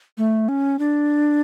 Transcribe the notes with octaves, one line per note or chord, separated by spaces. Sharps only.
A3
C#4
D4